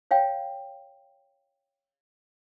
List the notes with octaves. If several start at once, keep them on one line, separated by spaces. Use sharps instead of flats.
C#5 F5 G5